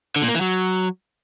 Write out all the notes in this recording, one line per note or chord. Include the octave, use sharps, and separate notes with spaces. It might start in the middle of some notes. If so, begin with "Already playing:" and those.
D3
A#2
A#3
E3
F#3